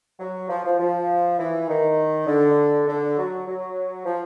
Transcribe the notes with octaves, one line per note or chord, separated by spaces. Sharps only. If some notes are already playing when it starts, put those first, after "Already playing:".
F#3
F3
F3
F3
E3
D#3
D3
D3
F#3
F#3
F3